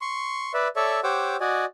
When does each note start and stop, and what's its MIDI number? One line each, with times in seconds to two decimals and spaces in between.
0.01 0.52 84
0.01 0.52 85
0.54 0.68 71
0.54 0.68 74
0.54 0.68 76
0.76 1.00 69
0.76 1.00 73
0.76 1.00 74
0.76 1.00 76
0.76 1.00 85
1.03 1.36 67
1.03 1.36 72
1.03 1.36 73
1.03 1.36 78
1.03 1.36 86
1.03 1.36 88
1.40 1.65 66
1.40 1.65 74
1.40 1.65 75
1.40 1.65 80